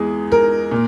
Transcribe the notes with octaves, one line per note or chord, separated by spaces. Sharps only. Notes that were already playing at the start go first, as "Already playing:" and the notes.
Already playing: E2 E3 G#3 G#4
A#4
A#2